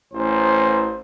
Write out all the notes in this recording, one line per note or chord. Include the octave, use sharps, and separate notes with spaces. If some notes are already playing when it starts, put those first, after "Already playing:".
A1 C5